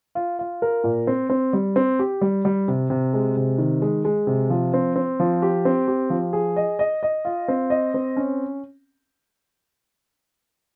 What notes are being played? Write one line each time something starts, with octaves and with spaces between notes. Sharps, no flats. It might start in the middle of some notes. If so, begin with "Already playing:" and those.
F4
F4
A#4
A#2
C4
C4
G3
C4
G4
G3
G3
C3
C3
G#3
C3
D#3
G#3
G#3
C3
F3
C4
C4
F3
G4
C4
G4
F3
G#4
D#5
D#5
D#5
F4
C4
D#5
C4
C#4